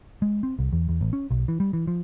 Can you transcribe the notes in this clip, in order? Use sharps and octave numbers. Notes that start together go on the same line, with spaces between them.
G#3
C4
C2
E2
E2
A1
C#4
B1
E3
G3
E3
F3